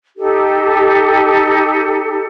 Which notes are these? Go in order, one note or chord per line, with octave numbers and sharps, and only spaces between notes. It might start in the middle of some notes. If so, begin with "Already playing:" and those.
D#4 G4 A4